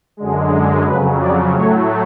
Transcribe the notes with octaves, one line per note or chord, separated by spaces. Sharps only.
F#2 D3 G#3
F2 C#3 F#3 B4
D5
A2 F#3 A3 C#5